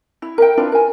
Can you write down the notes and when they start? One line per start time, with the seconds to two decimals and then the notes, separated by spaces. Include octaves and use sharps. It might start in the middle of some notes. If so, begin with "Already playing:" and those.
0.22 E4
0.38 A#4 E5 G5
0.57 D4 E4 F4 B4
0.72 A#4 G#5